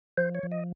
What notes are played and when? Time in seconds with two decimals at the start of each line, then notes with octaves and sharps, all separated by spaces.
0.17 F3 C5
0.35 C#5
0.43 F3
0.52 D#5